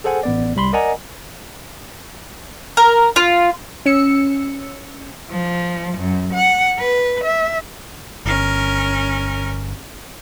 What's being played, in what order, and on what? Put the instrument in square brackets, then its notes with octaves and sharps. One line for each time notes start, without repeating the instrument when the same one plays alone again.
[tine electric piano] G#4 A4 C5 F#5 G#5
A1 B3 D5
C2 G3 B5 C6
A#4 D5 D#5 F#5 G#5 A#5
[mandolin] A#4
F4
[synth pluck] C#4 E6 C#7
[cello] F3
F#2
F#5
B4
E5
[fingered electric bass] G1 [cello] C#4 A#4